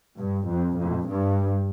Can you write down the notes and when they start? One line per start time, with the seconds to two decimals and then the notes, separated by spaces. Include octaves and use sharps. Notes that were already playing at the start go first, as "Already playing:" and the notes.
0.18 G2
0.47 F2
0.77 F2
1.07 G2